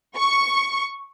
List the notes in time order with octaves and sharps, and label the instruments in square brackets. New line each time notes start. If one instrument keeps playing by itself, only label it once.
[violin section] C#6